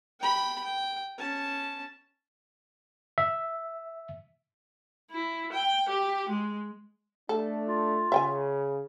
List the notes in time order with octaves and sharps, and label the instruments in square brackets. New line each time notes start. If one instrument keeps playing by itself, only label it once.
[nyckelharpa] G5 B5
G5
C#4 A5
[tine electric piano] E5
[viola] E4
G5
G4
G#3
[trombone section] A3 D4 [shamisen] A4
[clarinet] F4
[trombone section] C#3 [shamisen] E5 G5 G#5